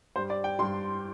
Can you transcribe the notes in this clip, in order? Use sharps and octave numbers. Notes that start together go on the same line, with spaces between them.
G2 G3 C5
D5
G5
G2 G3 C6